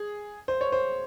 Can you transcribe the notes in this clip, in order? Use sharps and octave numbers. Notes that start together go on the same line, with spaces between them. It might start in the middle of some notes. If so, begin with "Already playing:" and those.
Already playing: G#4
C5
C#5
C5